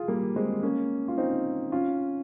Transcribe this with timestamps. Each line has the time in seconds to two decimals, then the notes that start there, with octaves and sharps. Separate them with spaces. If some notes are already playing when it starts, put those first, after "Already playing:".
Already playing: F4 G#4
0.08 G3 A#3
0.36 G#3 C4
0.63 A#3 C#4
1.08 F4
1.18 C4 D#4
1.72 C#4 F4